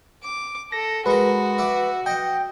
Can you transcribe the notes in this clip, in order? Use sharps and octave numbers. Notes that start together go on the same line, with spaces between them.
D6
A4 A#6
G#3 F#4 A#4 B4
D5 E5 F#5
D#5 F#5 G5